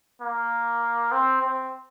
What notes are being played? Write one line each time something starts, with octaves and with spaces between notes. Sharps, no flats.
A#3
C4
C4